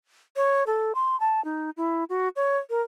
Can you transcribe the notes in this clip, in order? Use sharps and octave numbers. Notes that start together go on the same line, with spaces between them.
C#5
A4
C6
A5
D#4
E4
F#4
C#5
A#4